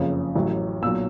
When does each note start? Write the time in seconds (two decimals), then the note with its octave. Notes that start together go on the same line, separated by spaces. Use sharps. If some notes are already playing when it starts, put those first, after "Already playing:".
Already playing: F#1 F2 C#3 F3
0.35 A1 A2 F#3
0.82 B1 A#2 F#3 E6